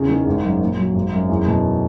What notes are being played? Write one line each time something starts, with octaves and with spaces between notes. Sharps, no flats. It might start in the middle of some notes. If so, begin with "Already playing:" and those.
Already playing: E2 C#3
D#3
G#1
F#2
A#2
F#3
G#1
F#2
E2
B2